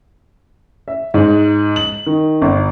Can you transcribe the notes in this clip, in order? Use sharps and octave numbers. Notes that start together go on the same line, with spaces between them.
E5
G#2
F#7
D#3
G1